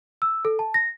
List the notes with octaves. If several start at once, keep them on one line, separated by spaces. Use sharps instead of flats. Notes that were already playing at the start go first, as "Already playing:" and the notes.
E6
A4
A5
A#6